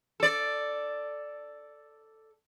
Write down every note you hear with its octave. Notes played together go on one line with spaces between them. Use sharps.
A4 D5